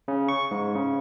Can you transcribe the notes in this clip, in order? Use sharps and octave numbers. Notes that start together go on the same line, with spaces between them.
C#3
C#6
G#2
C#3